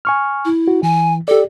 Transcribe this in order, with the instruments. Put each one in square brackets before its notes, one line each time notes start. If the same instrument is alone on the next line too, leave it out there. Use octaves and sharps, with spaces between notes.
[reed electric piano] G#5 C#6 F6
[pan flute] E4
[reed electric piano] F#4
[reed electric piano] E3 [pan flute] G#5
[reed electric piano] G4 D5 [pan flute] A4